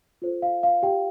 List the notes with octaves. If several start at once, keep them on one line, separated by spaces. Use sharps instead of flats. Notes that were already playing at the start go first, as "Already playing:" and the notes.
F4 A4 C5
F5
F5
G4 G5